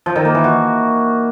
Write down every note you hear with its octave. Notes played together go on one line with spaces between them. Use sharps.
F3
D#3
A#3
E3
F#4